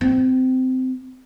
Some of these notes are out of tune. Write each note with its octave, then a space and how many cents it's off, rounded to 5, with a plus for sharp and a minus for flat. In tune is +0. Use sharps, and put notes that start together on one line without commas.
C4 -20